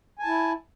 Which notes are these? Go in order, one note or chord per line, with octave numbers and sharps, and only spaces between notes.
E4 G#5 A5